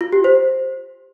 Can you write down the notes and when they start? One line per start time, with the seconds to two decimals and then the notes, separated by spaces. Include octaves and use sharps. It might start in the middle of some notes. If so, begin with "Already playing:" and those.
0.01 F4
0.13 G4
0.24 C5